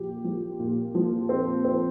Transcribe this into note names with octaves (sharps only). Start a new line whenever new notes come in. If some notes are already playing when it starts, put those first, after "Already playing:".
Already playing: A#2 F3 G4
F3
A#2
F3
C4
C4